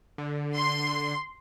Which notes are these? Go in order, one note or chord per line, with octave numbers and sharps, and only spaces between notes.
D3
C6